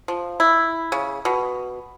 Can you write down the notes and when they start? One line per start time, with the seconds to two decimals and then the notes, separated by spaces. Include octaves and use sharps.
0.08 F3
0.40 E4
0.92 C#3
1.25 B2